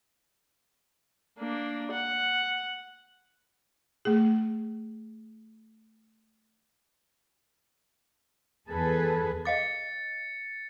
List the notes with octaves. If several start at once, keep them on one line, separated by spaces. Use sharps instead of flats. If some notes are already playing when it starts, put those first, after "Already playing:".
A#3 D4
F#5
A3 G#4
E2 G#4 A4 B4
D#5 F5 D6 A6 C#7